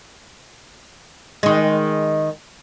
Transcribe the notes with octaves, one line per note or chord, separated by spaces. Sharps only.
D#3 G#3